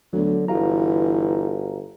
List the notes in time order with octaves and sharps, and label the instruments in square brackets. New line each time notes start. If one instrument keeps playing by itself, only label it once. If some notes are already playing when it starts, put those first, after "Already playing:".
[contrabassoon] D2 [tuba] D3 [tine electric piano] F#3 B3
[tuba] G1 [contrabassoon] E3 [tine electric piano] F#4 F5 A#5